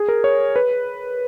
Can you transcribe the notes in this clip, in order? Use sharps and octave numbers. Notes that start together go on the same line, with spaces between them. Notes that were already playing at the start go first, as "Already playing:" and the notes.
Already playing: G#4
A#4
C#5
B4